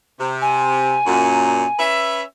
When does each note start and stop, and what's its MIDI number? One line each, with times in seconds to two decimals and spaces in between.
0.19 0.97 48
0.41 1.82 80
1.06 1.64 42
1.06 1.64 46
1.79 2.22 61
1.79 2.22 71
1.79 2.22 76